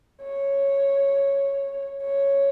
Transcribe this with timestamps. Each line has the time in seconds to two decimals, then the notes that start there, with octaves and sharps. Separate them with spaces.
0.23 C#5
2.02 C#5